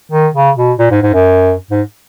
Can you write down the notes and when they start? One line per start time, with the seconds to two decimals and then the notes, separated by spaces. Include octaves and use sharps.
0.12 D#3
0.35 C#3
0.56 B2
0.79 A#2
0.91 G#2
1.02 G#2
1.13 F#2
1.71 G#2